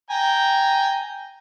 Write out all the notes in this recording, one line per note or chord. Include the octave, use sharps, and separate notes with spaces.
G5 G#5 A#5